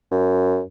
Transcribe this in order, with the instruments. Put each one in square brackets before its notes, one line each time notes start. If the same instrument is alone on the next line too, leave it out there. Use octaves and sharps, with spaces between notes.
[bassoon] F#2